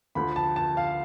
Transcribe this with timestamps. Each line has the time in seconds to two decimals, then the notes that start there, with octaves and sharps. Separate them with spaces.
0.15 D2 D3 F3 B5
0.36 A5
0.56 A5
0.77 F5